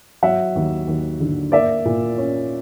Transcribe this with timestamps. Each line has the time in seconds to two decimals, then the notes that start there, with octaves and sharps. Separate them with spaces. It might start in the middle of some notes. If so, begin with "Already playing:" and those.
0.23 F#3 E5 F#5
0.55 D#2
0.88 D#2
1.20 D3
1.52 A#3 D5 E5
1.85 A#2
2.18 C#4